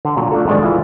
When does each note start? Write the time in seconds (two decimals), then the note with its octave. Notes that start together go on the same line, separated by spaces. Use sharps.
0.05 D3
0.17 A#2 F#3
0.32 A3 D4 F4 A4
0.47 G#2 D#3 G#3 F#4 A#4 D5
0.63 E3 E4 F4